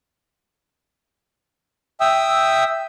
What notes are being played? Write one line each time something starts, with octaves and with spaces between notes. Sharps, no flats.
E5 G5 D#6 E6